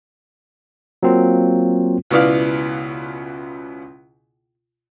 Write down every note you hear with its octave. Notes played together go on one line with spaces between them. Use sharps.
F#3 A#3 C4 F4
C#2 B2 B3 E4 D5 F5